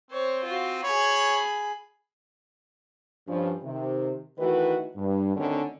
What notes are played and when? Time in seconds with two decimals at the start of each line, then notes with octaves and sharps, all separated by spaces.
0.11 C4 C5 C#5
0.43 F4 F#4
0.83 G#4 C#5 B5
3.28 G2 F3 C#4
3.63 C3 D#3
4.38 D#3 E3 A3 D#4 F#4 B4
4.96 G2
5.35 D2 D3 D#3 C4 C#4